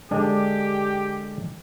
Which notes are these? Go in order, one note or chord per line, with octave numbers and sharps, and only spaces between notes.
D3 G#3 D4 G4